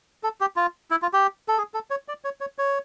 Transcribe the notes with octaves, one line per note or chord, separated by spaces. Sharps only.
A4
G4
F4
E4
F4
G4
A4
G#4
A4
C#5
D5
C#5
C#5
C#5